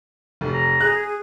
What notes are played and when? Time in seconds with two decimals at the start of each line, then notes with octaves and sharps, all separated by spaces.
0.41 F1
0.54 A#5
0.81 G#4 F#6